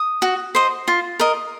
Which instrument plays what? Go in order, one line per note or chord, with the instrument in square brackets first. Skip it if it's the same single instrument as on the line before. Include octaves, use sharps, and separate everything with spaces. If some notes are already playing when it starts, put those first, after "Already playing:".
Already playing: [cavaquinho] D#6
F#4
C5 D#5
F4
A#4 D#5